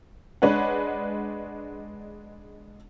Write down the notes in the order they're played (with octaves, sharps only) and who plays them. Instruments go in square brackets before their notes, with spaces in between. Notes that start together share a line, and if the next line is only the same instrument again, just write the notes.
[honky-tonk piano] G#3 D4 B4 C#5 F#5